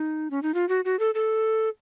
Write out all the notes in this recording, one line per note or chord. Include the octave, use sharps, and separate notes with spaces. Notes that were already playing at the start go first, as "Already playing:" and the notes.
Already playing: D#4
C#4
D#4
F4
F#4
F#4
A4
A4